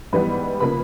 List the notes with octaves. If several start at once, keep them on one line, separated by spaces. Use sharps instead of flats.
G#2 E3 G3 B3 B4 B5
C#3 F3 A#3 B4 B5